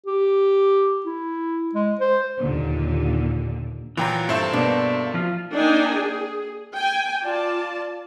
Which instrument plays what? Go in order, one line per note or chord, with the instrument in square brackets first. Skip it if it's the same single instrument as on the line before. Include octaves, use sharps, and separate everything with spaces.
[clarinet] G4
E4
G#3
C5
[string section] D#2 A#2 D3
[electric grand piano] A#2 G5 A#5 [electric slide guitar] E3 F#3 F4
[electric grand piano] G2 C5 E5 [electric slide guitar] C4 A4
[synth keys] B2 A#3 [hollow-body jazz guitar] D4
[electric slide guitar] F3 F4
[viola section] A#3 D4 D#4 G5 G#5
G#4
G5 G#5
F4 D5 A5